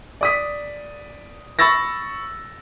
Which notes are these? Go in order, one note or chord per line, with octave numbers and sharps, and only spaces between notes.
D5 D#6 B6
B5 C#6 E6 A6 A#6